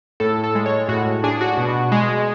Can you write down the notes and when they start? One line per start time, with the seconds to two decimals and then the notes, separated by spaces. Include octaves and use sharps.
0.20 A2 A4
0.44 A4
0.55 G#3
0.66 C#5
0.89 A2 F#4
1.24 D4 G#4
1.41 F#4
1.57 B2
1.92 G#3